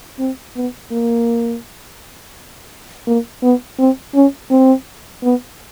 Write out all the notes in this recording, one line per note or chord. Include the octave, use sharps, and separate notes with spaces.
C4
B3
A#3
A#3
B3
C4
C#4
C4
B3